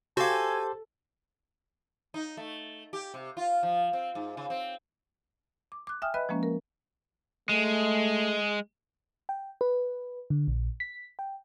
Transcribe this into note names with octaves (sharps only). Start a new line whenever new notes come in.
F#4 G4 A4 C5 F5 G#5
D#4
A3
G4
C3
F4
F3
C4
G#2
C#3
C4
D6
D6 F#6
E5 G5 G#5 D#6 F6
B4 D#5 E5 B5 F#6
F3 G#3 A#3 C#4
A#4
G#3 A3
G5
B4
D3
A#1
B6
G5